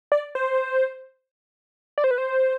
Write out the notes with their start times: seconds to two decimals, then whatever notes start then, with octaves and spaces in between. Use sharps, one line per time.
0.12 D5
0.35 C5
1.98 D5
2.04 C5
2.11 B4
2.18 C5